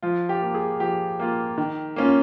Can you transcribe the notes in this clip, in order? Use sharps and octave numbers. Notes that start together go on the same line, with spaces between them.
F3 F4
G4
A#3 F4
G#4
F3 G4
A#3 F4
D#3
A#3 C#4 F4